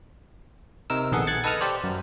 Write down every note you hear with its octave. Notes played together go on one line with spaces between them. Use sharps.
C3 D#4 A#4 E6
A#1 D#3 B3 G#4 A4 F#5
F#6 G#6 A6 C#7
A4 B4 D#5 A5 D#6 F6
G4 C5 D5
F#2